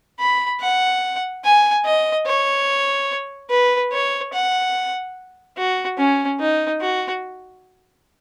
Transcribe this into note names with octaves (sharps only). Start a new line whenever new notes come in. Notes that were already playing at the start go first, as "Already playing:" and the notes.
B5
F#5
G#5
D#5
C#5
B4
C#5
F#5
F#4
C#4
D#4
F#4